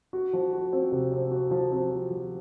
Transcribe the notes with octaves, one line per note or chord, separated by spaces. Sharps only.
F#4
F3
F#4
C4
C3
C4
F#4
F3
C4
F3
F3